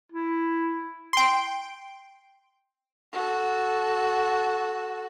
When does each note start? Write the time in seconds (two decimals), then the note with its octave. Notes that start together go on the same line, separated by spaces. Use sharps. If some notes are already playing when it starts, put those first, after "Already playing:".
0.12 E4
1.13 G5 C6
3.12 F#4 A4